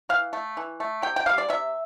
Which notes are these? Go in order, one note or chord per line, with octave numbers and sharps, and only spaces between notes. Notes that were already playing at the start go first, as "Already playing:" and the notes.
E3 F5
A3
E3
A3
C3 G5
G5
G3 A#3 F5
D5
C3 E5